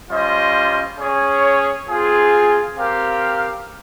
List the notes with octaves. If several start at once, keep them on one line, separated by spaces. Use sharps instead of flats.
G3 C#4 F4 C5 D#5
C#4 G#4 C#5
C4 F4 G#4
C4 G4 A#4 F5